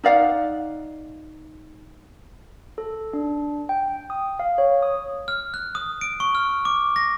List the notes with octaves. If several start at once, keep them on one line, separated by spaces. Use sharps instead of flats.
D#4 D5 F5 F#5
A4
D4
G5
D#6
F5
C#5
D#6
F6
F#6
D#6
D7
C#6
F6
D6
A#6